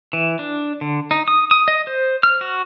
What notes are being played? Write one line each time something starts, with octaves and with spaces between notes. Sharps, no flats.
E3
D4
D3
D#4
D#6
D#6
D#5
C5
F6
F#4